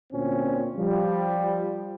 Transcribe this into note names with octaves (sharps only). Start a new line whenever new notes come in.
D2 A#2 C4 C#4
F3 G3